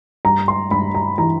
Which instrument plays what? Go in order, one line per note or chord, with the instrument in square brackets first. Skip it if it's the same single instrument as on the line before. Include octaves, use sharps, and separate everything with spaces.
[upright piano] G2 A#5
C6
G2 B5
A#5
E3 A#5